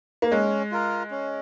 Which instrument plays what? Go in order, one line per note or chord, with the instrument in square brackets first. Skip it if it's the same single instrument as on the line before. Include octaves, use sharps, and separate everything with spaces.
[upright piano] A#3
[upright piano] G#3 [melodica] C#4
[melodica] F4 A#4
C#4